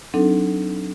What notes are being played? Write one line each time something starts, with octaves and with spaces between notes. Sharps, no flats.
F#3 C4 D4 D#4 A4